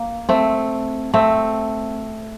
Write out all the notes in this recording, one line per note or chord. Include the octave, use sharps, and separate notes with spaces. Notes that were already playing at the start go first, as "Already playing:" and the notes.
Already playing: A#3
A3 C4
A3 C4